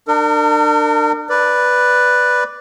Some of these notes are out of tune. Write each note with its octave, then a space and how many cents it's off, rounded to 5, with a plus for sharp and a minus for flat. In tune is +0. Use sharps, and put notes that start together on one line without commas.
D4 +35 A#4 -35
B4 +0 D5 +0